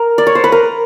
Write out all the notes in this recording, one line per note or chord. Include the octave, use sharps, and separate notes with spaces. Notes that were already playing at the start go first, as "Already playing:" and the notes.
Already playing: A#4
D5
C#5
C5
B4
A#4